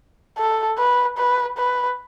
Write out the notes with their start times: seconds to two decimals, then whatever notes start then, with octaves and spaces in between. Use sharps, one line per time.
0.38 A4
0.78 B4
1.18 B4
1.58 B4